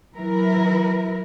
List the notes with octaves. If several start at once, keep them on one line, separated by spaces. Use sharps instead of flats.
E3 F#3 E4 A#4 B4